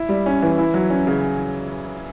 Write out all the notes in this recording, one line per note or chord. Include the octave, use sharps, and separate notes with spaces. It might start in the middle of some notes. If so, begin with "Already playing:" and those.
Already playing: E4
G3
C#4
E3
E4
F#3
C#4
C#3